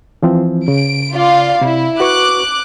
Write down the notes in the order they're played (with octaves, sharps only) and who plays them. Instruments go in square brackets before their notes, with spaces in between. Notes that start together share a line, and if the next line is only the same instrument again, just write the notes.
[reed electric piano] E3 F3 C4
[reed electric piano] C#3 [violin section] D7
[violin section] F4 D5 F5
[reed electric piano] C3 [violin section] E4
[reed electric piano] F#4 B4 C#6 [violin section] D6 F#6